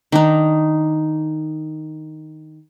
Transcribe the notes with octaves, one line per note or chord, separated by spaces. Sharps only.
D#3 D4 D#4